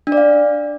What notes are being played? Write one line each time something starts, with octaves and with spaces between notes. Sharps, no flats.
D4
D5
F5